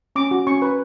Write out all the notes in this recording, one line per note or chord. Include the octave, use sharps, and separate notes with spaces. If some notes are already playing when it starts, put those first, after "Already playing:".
C#4 D6
F#4
C#4 C#6
B4